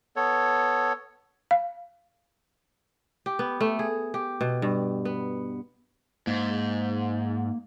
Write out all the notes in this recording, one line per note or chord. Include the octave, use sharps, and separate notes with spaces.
B3 A4 C#5
F5
G4
B3
A3
G#4
G4
B2
G2
B3
G#2 A#3